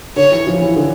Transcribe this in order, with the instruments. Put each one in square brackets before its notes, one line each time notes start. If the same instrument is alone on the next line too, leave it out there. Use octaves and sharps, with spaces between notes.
[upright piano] D3 [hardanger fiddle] C#5
[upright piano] E3
F3
E3
D3